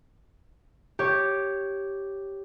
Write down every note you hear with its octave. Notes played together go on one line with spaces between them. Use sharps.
G4 C#5